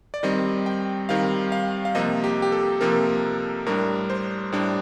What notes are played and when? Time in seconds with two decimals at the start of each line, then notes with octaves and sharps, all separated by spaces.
0.14 D5
0.23 D#3 G3 C4 D#5
0.66 G5
1.09 D#3 G3 C4 F5
1.52 F5
1.85 F5
1.95 C3 F3 A#3 D#5
2.24 G4
2.42 G4
2.52 A4
2.81 C3 F3 A#3 A#4
3.66 A2 G3 D4 A#4
4.10 C5
4.52 A2 G3 D4